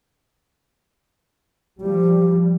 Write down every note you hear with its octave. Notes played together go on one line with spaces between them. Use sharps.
F3 G3 G4